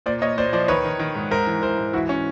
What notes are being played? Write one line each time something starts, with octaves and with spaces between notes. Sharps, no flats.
A#2 C5 D5
A#2 C#5 D#5
A#2 C5 D5
F3 C5 D5
D#3 B4 C#5
D#3
D#3
G#2
G#2 A#4 C5
E3
E3 A#4 C5
G#2
E3 E4 F#4
E3 C#4